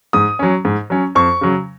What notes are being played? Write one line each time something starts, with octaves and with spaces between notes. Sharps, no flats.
G#2 D#6
F#3 C#4
G#2
F#3 C#4
F2 C#6
C#3 F#3